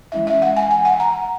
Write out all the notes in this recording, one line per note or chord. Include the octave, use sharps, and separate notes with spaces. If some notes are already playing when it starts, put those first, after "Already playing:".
E3 G#3 C#4 E4 E5
E5
F#5
G#5
G#5
F#5
A#5